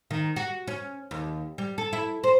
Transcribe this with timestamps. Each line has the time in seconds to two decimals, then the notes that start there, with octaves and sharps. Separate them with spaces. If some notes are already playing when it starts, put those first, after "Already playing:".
0.11 D#3
0.36 F#4
0.68 C#4
1.11 D#2
1.58 G3
1.78 A4
1.93 E4
2.24 C5